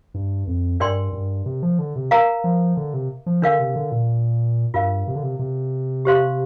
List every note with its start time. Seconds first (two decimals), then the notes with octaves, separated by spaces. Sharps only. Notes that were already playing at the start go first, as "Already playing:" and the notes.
0.14 G2
0.47 F2
0.80 G2 D4 A#4 D5 G5 C6
1.13 G2
1.46 C3
1.63 F3
1.79 D3
1.96 C3
2.11 A#4 F5 A#5
2.44 F3
2.77 D3
2.94 C3
3.26 F3
3.42 D3 D4 A#4 F5
3.60 C3
3.76 D3
3.92 A#2
4.74 G2 F4 A#4 F5
5.07 C3
5.15 D3
5.23 C3
5.39 C3
6.05 G4 C5 F5 C6